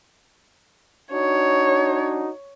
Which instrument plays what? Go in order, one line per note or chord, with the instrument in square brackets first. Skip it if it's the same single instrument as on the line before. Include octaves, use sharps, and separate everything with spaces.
[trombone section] D4 D#4 F#4 [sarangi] C#5